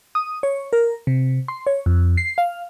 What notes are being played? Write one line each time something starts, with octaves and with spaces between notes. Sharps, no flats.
D#6
C#5
A#4
C3
C6
C#5
F2
C7
F5